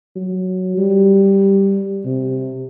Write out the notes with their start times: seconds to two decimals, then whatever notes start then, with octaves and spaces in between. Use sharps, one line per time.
0.16 F#3
0.78 G3
2.05 C3